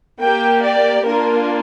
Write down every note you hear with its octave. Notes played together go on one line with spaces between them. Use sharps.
A#3 G4 G5
D5
A#3 D4 F4 A#4